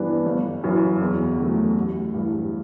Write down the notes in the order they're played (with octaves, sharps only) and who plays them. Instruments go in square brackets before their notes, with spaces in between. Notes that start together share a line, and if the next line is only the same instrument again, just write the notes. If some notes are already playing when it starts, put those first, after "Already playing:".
Already playing: [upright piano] G1 G2 E3 B3 D4
G1
F#2 E3
E2
D3 F#3 A3
A1
G2 E3